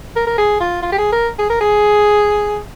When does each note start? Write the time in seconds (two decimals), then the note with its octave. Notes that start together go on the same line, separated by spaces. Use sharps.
0.16 A#4
0.27 A#4
0.38 G#4
0.60 F4
0.83 F4
0.92 G4
0.98 G#4
1.12 A#4
1.39 G#4
1.50 A#4
1.61 G#4